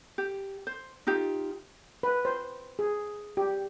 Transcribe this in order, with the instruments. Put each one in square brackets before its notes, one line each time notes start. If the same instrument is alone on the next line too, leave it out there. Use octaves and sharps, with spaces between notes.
[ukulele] G4
C5
D#4 F4 G4
[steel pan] B4
C5
G#4
G4